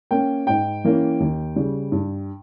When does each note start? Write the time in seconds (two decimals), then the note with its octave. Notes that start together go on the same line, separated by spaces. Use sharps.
0.11 A#3 C#4 G5
0.47 G#2 G5
0.84 E3 A#3 C#4
1.20 D#2
1.56 C#3 G3
1.92 G2